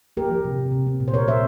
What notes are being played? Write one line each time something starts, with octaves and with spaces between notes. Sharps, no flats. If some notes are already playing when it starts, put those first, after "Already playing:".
A#3 G4 A#4
F3
C3
C3
C3
C4
A#2
C5
C4 A#4 C#5
C4 C5 E5